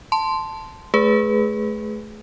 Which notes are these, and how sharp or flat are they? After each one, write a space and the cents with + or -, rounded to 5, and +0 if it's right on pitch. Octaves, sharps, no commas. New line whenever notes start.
A5 +0 C6 -5
A3 -30 G#4 +0 B4 +0